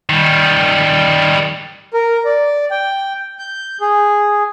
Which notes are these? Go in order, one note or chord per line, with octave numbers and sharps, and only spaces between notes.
D#3 G3
A#4
D5
G5
G6
G#4